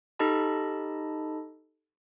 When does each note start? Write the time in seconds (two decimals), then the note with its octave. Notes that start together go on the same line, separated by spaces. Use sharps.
0.19 D#4 G4 A4 D#5 A5 B5